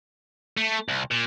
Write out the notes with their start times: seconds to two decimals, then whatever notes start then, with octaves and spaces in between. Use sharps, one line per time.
0.57 A3
0.89 C2
1.11 A#2